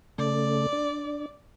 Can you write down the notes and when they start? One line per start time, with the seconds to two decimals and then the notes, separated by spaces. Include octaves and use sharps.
0.18 C#3 A3 D5
0.72 D4